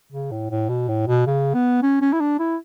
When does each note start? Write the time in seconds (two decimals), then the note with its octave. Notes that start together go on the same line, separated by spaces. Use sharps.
0.12 C#3
0.31 A2
0.51 A2
0.69 B2
0.88 A2
1.07 B2
1.27 C#3
1.54 B3
1.83 C#4
2.01 C#4
2.13 E4
2.20 D4
2.39 E4